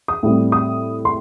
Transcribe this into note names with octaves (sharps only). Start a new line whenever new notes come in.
D#6
A2 G3 C4
D#6
C6